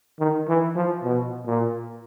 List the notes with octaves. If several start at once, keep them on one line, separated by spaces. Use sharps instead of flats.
D#3
E3
F3
B2
A#2